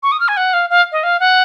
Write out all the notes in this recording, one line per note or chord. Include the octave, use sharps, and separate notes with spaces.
C#6
D#6
F6
G#5
F#5
F5
F5
D#5
F5
F#5